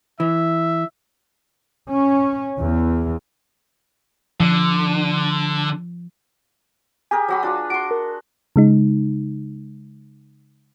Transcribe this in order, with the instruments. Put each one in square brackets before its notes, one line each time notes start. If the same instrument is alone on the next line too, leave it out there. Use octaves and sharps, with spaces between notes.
[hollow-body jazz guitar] E3 [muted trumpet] E5
[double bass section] C#4
E2
[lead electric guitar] D3 [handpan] F3
[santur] G4 G#4 A#4 [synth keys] G#5
[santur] F#3 F#4 B5
D4 F4 B4
[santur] F#4 C6 [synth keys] D7
[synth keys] A#4
[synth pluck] C#3 G#3 D#4